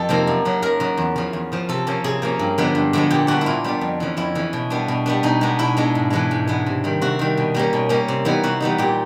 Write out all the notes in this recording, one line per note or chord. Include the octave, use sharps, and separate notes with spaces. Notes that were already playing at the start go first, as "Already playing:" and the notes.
Already playing: F2 A4
C3 F3 A#3 D#4
F#2
C#3 F#3
F#2 A#4
C#3 F#3
E2
C#3 F3
E2
C#3 F3
C3 A4
F3 A#3 C#4
C3 G#4
F3 A#3 C#4
G2
D3 F3 G#3 B3
G2
D3 F3 G#3 B3
A#2 G4
G3 B3 D4 F#4
E4
A#2 F4
G3 B3 D4
F2
C#3 E3
F2 E4
C#3 E3
B2
G3 B3 D4
B2
G3 B3 D4
B2 D#4
G#3 B3 D4
B2 E4
G#3 B3 D4
G#2
E3 G#3 B3 D4
G#2
E3 G#3 B3 D4
C3
D#3 G3
C3 F#4
D#3 G3
B2
G3 A#3 C#4
B2
G3 A#3 C#4
C3
E3 G3 B3 D#4
C3 F#4
E3 G3 B3 D#4
A#2 G4